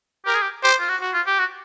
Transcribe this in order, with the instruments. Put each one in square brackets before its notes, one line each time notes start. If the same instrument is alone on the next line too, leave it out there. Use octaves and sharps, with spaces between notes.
[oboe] G4 [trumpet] A#4
[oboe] G#4
G4
[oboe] G4 [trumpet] C5
[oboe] F4
F#4
[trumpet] F#4
[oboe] F4
G4
F#4